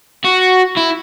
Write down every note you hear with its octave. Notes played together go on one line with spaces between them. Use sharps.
F#4
E4